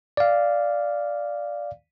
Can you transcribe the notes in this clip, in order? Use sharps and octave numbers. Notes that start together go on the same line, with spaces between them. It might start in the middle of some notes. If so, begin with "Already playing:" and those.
D5 F5